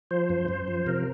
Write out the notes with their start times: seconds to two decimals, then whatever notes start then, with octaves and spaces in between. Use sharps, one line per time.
0.11 F3 C5
0.29 F#2
0.48 F#2
0.68 F3
0.86 C3 A#4